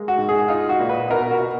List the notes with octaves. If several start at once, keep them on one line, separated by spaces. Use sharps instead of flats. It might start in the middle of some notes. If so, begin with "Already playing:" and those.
Already playing: G#3 A#3
F#4
G#2
G#4
D#4 F4
F#4
A#2
B4
B2 A#4
F#4
B2